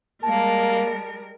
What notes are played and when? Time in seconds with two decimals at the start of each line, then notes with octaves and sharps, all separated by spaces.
0.23 G3 G#3 A#3 A#4 A5